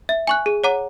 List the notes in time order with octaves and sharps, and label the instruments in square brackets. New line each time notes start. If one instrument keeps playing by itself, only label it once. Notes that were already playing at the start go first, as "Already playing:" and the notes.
[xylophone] E5
G#5 C#6 F#6
G#4
C#5 F#5 A#5 D6